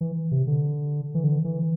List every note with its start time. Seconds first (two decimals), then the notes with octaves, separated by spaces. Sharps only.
0.01 E3
0.32 C3
0.47 D3
1.15 E3
1.24 D3
1.45 E3